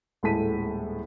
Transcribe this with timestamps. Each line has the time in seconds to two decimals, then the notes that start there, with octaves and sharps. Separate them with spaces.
0.23 D#1 A2 G#3 A4 B6 D#7